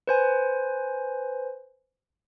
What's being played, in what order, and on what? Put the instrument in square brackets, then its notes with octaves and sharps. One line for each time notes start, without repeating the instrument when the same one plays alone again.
[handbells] B4 C5 G#5